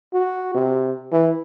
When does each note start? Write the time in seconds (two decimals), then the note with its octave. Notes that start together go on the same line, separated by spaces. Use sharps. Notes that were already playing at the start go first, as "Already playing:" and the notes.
0.14 F#4
0.55 C3
1.12 E3